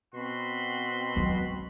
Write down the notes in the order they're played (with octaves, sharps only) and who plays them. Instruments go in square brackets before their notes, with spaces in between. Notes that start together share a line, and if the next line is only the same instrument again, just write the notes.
[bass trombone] B2 [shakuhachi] C4 [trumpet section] F#4 B5 C6
[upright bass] F#3 G#3